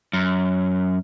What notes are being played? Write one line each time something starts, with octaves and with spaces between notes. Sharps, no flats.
F#2